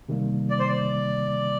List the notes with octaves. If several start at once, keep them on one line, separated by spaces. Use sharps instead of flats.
C3 D#3 G3 A#3
D5
C5
D5